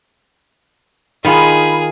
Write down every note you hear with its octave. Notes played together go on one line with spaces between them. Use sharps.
D#3 D#4 F4 G#4 B5